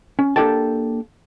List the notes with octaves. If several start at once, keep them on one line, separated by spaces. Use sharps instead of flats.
C#4
A#3 D4 G4 A4 G5 A5